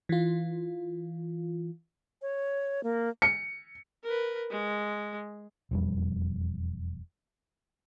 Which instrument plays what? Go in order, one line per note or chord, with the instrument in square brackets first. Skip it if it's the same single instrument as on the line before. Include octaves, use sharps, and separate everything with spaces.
[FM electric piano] E3 F4
[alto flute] C#5
A#3
[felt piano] C#7
[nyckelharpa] A#4 B4
G#3
[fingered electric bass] E1 F2 G3